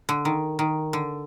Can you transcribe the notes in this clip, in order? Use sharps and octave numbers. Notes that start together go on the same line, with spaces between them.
D3
D#3
D#3
D3